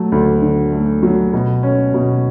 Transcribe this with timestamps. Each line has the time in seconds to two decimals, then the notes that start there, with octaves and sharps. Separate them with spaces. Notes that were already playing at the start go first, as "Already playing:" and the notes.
Already playing: F#3 A3
0.12 D2
0.42 D3
0.73 A3
1.03 F#3
1.33 B2
1.63 C#4
1.94 B2